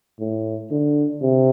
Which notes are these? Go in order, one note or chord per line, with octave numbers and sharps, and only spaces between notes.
A2
D3
C3